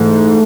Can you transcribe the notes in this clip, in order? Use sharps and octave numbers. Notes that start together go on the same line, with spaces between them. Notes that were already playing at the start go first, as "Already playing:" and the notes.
Already playing: G#2 E3 A3